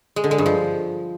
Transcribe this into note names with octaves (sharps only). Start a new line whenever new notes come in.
G#3
D3
G#3
G2
F3